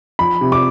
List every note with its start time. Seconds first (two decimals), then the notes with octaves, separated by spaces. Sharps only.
0.19 F3 B5
0.41 C3
0.52 D6